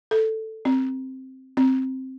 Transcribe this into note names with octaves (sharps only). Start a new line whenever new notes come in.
A4
C4
C4